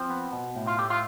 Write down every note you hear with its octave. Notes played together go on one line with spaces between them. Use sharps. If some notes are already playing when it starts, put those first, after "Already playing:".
Already playing: F3 C4
B3
B2
A2
F4
A3 G4
F4